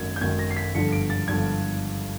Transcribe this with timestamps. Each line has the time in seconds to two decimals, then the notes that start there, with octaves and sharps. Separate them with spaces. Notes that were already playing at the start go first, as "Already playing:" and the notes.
Already playing: G#1 F#2 D#3 F#3 G#6
0.16 G6
0.21 G#1 F#2 D#3 F#3 G#6
0.39 A#6
0.51 C7
0.57 B6
0.75 G1 G2 D3 F3 C#7
0.93 D7
1.10 A6
1.28 G1 G2 D3 F3 G#6